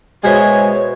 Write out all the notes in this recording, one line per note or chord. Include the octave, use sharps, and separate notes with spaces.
B2 G#3 C5 C#5 E5 G#5